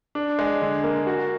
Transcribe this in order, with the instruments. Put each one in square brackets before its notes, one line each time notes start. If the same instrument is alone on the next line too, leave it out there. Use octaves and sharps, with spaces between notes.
[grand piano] D4
G#3
D3
A#3
F#4